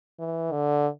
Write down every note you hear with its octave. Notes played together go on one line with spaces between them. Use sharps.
E3
D3